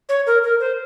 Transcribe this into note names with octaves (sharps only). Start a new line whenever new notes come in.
C#5
A#4
A#4
C5